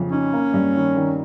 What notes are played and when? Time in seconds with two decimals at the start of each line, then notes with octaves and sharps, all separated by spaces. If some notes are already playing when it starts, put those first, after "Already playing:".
Already playing: F2 C#3
0.12 C#4 D#4
0.33 A#3
0.54 G2
0.76 D#3
0.97 D#3